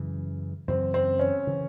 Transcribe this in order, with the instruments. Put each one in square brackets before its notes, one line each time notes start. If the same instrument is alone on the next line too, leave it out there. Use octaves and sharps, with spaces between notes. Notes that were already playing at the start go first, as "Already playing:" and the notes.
Already playing: [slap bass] F#2 C#3 E3
[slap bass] F#2 C#3 E3 [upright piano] C4
[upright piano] C4
C#4
[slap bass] C#3 E3